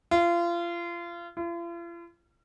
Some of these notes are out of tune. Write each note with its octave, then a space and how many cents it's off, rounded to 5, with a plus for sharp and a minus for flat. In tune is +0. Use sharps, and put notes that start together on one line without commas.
F4 -30
F4 -45